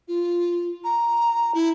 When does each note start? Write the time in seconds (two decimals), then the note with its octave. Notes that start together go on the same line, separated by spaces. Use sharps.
0.08 F4
0.84 A#5
1.55 E4